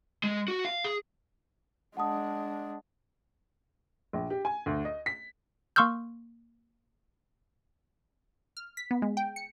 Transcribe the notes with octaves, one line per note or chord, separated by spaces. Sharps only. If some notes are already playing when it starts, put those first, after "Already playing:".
G#3
F#4
F5
G#4
G#3 D4 F#5 A5 D#6
A#1
G4
G#5
D2
D#5
B6
A#3 C6 C#6 E6 F6 G6
F6
B6
B3
G#3
G5
C#7